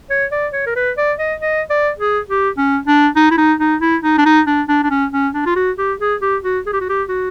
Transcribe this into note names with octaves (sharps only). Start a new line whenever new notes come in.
C#5
D5
C#5
A#4
B4
D5
D#5
D#5
D5
G#4
G4
C#4
D4
D#4
E4
D#4
D#4
E4
D#4
D4
D#4
D4
D4
D4
C#4
C#4
D4
F4
F#4
G4
G#4
G4
F#4
G#4
G4
F#4
G4
F#4